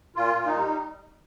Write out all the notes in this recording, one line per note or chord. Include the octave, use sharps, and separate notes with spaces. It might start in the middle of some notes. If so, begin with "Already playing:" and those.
A#2 F4
A#2
D#4
G3